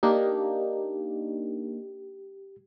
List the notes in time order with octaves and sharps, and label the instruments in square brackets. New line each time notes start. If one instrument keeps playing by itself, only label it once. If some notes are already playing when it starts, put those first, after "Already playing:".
[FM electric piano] A#3 D4 D#4 [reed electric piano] G4